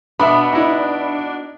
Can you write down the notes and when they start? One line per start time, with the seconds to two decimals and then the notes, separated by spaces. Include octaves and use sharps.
0.20 B2 B3 D4 E5 B5
0.53 D#4 E4